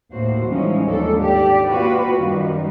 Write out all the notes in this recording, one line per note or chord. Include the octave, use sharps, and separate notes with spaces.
D#2 A2 A#3 F#4 C5
E3 F3 G3 G#3 C#4 D#4
D#2 G#2 G#3 D4 A4
G4 D5
A#3 F4 F#4 B4
F#2 D#3 G3